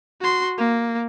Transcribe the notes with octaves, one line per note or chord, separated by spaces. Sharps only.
F#4 C6
A#3